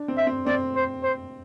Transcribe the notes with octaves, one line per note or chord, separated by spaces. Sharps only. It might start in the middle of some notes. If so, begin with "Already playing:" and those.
Already playing: D4
C4
E5
C4
C4 D5
C5
C5